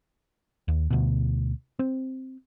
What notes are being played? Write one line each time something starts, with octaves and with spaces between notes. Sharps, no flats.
D#2
D2 B2
C4